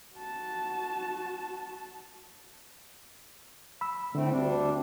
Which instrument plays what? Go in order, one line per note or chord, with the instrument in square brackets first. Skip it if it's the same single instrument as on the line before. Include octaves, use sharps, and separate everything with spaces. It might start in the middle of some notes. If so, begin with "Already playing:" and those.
[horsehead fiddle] F#4 A5
[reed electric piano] B5 E6
[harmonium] A2 A3 C4 [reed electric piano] D3
[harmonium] D2 G3 D4 [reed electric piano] C4